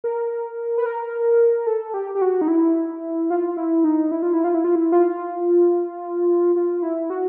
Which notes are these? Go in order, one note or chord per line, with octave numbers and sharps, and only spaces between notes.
A#4
B4
A#4
A4
G4
G4
F#4
D#4
E4
F4
E4
D#4
E4
F4
E4
F4
E4
F4
E4
F4
F4
E4
F#4